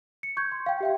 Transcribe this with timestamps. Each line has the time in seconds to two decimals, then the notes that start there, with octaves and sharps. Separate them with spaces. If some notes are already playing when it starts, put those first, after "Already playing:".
0.23 C#7
0.37 C#6 G6 G#6
0.52 C6
0.66 F5 G5
0.81 G4 E5 G5